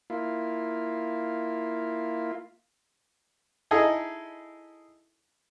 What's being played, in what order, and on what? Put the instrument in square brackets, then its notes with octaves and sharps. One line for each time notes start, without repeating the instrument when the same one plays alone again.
[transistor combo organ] A#3 E4 F4
[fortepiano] D#4 E4 G#4 A4